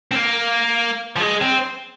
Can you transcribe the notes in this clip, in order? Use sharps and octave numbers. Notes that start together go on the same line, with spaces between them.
C4
A#3
F3
G#3
C4